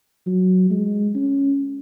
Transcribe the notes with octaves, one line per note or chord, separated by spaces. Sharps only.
F#3
G#3
C#4